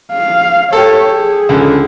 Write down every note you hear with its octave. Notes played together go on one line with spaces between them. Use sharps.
F5
G4 A4 C#5
G#4
C#2 D3